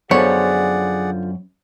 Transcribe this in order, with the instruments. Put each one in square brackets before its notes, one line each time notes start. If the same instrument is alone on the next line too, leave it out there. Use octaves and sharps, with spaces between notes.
[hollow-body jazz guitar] F#2 B3 [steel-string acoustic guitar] D3 F3 [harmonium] G#4 D5 F#5 [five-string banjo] C#5